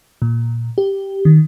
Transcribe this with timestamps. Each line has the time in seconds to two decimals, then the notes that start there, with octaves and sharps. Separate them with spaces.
0.22 A#2
0.78 G4
1.25 D#3